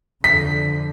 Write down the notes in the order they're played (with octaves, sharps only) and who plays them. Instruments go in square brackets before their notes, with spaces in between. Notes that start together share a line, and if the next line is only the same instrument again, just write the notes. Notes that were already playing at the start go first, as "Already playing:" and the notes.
[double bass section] F2 D3 [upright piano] B6